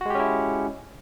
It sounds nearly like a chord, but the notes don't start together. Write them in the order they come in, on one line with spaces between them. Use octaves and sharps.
F#4 G#3 G4 C#4 E4